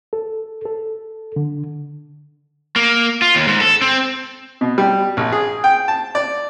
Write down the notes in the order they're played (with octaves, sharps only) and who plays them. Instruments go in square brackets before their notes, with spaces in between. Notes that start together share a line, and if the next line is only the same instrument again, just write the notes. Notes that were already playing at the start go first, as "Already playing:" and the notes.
[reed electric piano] A4
A4
D3
[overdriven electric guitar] A#3
F4
D#2
G#2
A4
C4
[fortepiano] B2
G3
A#1
G#4
G5
A5
D5